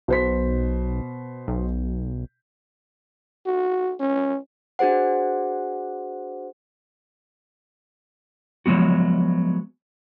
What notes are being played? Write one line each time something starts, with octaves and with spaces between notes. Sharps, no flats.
B1 B2 C5 B6
B1
F#4
C#4
D4 F#4 G#4 C5 F#5
F3 F#3 G#3 B3 F#4